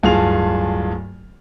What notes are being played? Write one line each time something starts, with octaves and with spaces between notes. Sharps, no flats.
D1 G2 F4 G#4 A5 F7